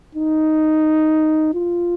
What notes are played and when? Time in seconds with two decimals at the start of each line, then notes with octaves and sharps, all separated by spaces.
0.15 D#4
1.54 F4